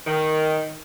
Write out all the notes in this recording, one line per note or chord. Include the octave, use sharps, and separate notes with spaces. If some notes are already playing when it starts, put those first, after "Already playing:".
D#3